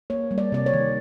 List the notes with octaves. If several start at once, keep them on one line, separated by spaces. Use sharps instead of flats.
A#3 C#5
G3
D5
C3 D5
C#5
D#3